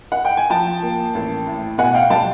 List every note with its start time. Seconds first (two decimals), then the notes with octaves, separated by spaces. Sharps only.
0.12 F#5
0.25 G5
0.37 G#5
0.50 F3 G5 A5
0.83 A#3
1.15 A1
1.46 A2
1.78 B2 F#5 G#5
1.94 F5 G5
2.10 G3 G5 A5